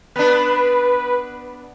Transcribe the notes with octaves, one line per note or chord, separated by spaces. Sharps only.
B3 D4 B4